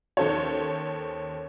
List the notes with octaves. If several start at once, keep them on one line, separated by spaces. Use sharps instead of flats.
D#2 C#4 A4 C5 C#5